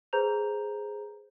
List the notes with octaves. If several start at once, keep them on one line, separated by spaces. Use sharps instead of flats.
G#4 B4 C5 A#5 G6 F7